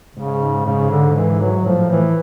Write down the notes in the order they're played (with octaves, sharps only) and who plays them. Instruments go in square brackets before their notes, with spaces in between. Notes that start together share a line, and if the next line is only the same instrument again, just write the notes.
[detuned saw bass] G#2 [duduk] C#3
[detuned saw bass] G#2 [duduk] C#3
[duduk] D3
E3
F#3
[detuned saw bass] A2 [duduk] F3
[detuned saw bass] A2
[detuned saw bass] A2 [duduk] E3